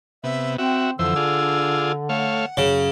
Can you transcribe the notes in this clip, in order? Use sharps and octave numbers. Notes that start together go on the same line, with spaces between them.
C3 B3 E5
C4 F#4 E5 G5
F2 D3 E3 C5 E6
D4 F4 G#4
A3 C#5 F5 F#5
F#2 C#3